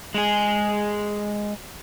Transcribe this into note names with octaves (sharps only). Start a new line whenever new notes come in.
G#3 G#4